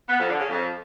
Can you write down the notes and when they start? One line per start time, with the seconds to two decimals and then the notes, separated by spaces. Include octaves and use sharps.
0.08 B3
0.18 F2
0.28 D3
0.38 C#3
0.48 F2